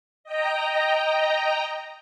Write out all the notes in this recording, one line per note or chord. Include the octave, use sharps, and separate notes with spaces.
D#5 G5 A#5